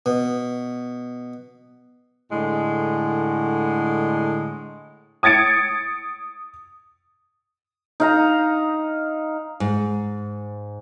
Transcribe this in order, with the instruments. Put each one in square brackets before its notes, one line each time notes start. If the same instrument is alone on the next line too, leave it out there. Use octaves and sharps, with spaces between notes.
[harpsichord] B2
[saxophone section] A2 D3 G#3
[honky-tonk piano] D#6 G#6 A6 C#7 D7
[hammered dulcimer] D#4 F5 A#5
[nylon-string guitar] G#2